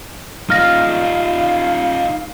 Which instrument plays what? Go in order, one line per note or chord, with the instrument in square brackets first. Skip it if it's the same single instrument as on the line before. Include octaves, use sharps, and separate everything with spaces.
[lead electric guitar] D#4 F4 [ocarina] F5 [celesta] F6 A#6